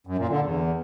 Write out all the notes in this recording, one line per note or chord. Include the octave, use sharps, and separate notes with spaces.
F#2
A#2
D3
E2